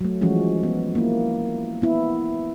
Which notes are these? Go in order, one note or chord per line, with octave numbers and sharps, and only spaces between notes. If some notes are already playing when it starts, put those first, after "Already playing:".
F#3 A3
E3 F3 G#3 C#4 F#4
B3
A#3 E4
B3 E4